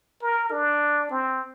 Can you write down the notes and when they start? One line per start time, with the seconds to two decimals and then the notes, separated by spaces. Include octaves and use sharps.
0.22 A#4
0.51 D4
1.11 C4